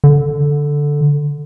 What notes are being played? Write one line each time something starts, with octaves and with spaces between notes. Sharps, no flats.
D3